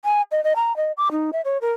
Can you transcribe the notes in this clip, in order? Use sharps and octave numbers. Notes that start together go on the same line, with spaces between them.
G#5
D#5
D#5
A#5
D#5
D6
D#4
E5
C#5
A#4